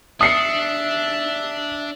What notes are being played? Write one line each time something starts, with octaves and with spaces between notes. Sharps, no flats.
D4 E5 D#6 C7 C#7